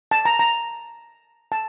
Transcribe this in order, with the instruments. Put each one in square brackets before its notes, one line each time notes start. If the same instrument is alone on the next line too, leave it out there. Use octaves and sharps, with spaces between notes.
[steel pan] A5
A#5
A#5
A5